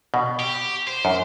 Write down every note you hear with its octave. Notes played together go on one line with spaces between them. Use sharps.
B2
G4
C5
F#2